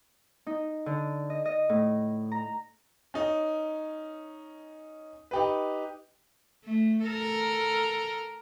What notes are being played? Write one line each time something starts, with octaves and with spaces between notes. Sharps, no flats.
D#4
D3
D#5
D#5
A2
A#5
C#4 D#4
D#4 G4 B4
A3
A4 A#4